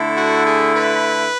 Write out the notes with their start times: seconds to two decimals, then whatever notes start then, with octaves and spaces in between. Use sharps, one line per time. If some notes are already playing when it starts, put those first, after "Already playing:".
Already playing: D3 A3 E4
0.15 F#4
0.45 G#4
0.74 B4